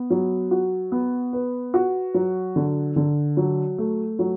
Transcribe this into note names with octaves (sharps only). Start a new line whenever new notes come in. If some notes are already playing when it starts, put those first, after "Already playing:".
Already playing: B3
F#3
F#4
B3
B4
F#4
F#3
D3
D3
F#3
A3
F#3